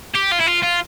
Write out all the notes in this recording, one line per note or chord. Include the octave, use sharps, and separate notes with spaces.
G4
F4
E4
F4
F4